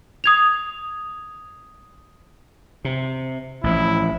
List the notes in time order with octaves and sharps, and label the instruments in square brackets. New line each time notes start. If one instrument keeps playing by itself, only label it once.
[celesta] D#6 G#6 F7
[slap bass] C3
[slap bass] A1 F3 [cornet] E4